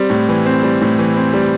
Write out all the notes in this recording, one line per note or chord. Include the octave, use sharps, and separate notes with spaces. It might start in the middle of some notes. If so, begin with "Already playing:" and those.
Already playing: G3 C4
A2
E3
C4
G3
A2
E3
C4
G3